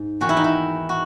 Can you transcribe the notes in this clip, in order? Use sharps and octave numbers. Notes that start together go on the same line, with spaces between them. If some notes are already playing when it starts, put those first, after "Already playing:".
Already playing: G#2
E2 D#3 F#4
E4
D#4
E4
F#4